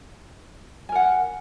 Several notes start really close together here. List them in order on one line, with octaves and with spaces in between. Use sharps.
G#5 A#4 F#5